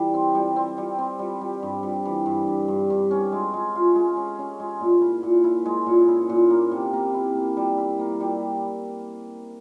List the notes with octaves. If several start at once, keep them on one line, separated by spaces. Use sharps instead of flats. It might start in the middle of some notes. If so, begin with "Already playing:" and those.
Already playing: E3 G3
C4
G3
C4
G3
C4
G3
G3
G2
G3
E3
G2
G2
G2
G2
C#4
G#3
G#3
F4
G#3
C#4
C#4
G#3
A#2
E4
A#2
E4
G#3
A#2
E4
A#2
A#3
C3
A#3
E4
A#3
G3
E4
A#3
G3